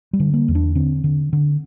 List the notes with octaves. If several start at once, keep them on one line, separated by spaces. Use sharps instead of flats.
G3
D3
A#3
E2
D4
D3 C4
D3
D3